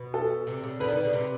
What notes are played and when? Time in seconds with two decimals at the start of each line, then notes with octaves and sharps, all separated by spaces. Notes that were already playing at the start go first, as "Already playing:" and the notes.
Already playing: B2
0.14 A4
0.47 C3
0.64 C#3
0.80 D3 B4
0.89 D#3
0.96 D3
1.05 C#3
1.13 C3